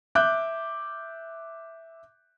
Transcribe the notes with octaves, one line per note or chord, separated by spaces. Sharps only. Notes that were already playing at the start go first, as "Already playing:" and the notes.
E5 D6 F#6 G6